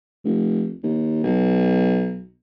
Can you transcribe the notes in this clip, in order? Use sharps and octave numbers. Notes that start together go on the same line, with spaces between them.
F1
D#2
B1